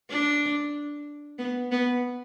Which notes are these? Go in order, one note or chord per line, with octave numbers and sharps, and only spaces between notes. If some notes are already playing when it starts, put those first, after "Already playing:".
D4
B3
B3